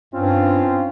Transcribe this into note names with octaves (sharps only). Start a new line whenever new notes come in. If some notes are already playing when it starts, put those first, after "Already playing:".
G2 C4 C#4 F4